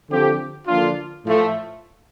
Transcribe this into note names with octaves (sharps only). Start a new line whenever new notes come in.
D3 F3 C4 G4
D3 F3 A#3 D4 F4
A2 F3 A3